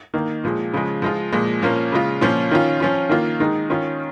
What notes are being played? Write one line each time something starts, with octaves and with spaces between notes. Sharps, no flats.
D#3 A#3 D#4
A#2 F3 G#3
C#3 F3 G#3
F3 G#3 F4
A#2 F3 G#3
A#2 F3 A#3 C#4
C#3 G#3 F4
A#2 F3 C#4 F4
D#3 C#4 F4
F3 C#4 F4
D#3 A#3 F4
D#3 G#3 D#4
D#3 C#4 F4